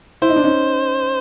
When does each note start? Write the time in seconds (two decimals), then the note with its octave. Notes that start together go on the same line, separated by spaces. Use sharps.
0.22 E4 C5
0.29 D#4
0.36 D4
0.44 C#4 D#4